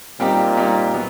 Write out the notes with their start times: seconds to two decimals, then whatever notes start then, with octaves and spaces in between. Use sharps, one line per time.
0.20 A#2 G3 C4 D#4 G4
0.57 G3 C4 D#4 G4
0.94 F#3 B3